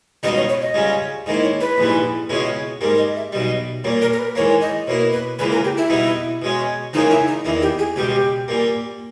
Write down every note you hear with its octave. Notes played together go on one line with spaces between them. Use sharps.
C#2 B2 G3 B3 D#4 D#5
C#5
C#5
D#5
C#2 C#3 G3 C#4
G#2 D#3 A#3 E4 D#5
C#5
B4
A#1 G#2 E3 G3
C#2 B2 G#3 C#4 E4
G#2 G3 A#3 A#4
D#5
E5
B1 B2 G3 D#5
A#2 G3 A#3 C#5
A#4
A#4
B4
G#2 E3 A#3 C#5
D#5
B2 A#3 E4 C#5
B4
C#2 C#3 E3 A#3 B4
A#4
G4
E4
B2 G3 B3 D#4
B2 G#3 C#4
C#2 C#3 E3 A#3 C#4 D#4
E4
D#4
E2 D#3 A#3 E4
G4
G#4
C#2 B2 G3 G4
A#2 G3 A#3